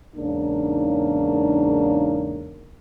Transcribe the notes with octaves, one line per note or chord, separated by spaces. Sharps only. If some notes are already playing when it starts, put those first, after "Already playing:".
E2 G#2 C#3 A#3 D4 D#4